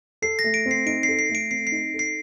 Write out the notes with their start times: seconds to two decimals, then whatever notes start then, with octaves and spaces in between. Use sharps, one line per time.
0.22 A4 C7
0.39 A#6
0.44 A3
0.54 D7
0.66 C4
0.71 C7
0.86 D#4 D7
1.03 C7
1.08 A4
1.19 C7
1.29 A3
1.35 D7
1.51 C4 C7
1.67 C7
1.72 D#4
1.94 A4
1.99 C7